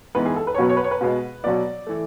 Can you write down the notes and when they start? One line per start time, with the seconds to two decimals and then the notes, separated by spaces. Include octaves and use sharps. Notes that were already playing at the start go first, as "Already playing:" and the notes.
0.15 G#2 E3 B3 B4
0.26 G#4
0.36 A4
0.47 B4
0.54 C#5
0.58 B2 F#3 B3 B4
0.69 C#5
0.77 B4
0.84 C#5
0.91 B4
1.01 B2 G#3 B3
1.44 B2 F#3 B3 D5
1.87 E3 A3